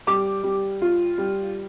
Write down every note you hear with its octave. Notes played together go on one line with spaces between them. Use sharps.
G3 D6
G3
F4
G3